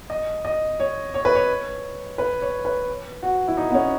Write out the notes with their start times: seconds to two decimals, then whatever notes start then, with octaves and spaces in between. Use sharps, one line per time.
0.10 D#5
0.45 D#5
0.80 C#5
1.14 C#5
1.25 B4
1.35 C#5
2.18 B4
2.42 C#5
2.65 B4
3.23 F#4
3.48 E4
3.57 D#4
3.70 B3
3.74 C#4